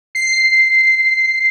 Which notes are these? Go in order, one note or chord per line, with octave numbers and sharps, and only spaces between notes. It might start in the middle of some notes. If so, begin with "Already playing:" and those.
C7